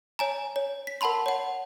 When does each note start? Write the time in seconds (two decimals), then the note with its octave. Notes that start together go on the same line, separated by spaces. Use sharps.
0.19 C#5 G#5 A#5
0.56 C#5
0.87 B6
1.01 A#4 F#5 A5 B5 C6
1.26 C#5 F#5